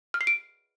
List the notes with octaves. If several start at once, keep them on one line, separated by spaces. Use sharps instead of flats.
F6
C7
D7